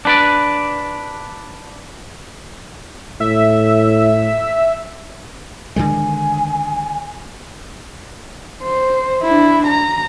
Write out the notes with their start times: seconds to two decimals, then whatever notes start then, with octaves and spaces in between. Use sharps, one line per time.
0.05 D4 B4 D5
3.20 A2 E5
5.76 D3 D#3 G#3 G#5
8.63 C5
9.22 D4 E4
9.67 A#5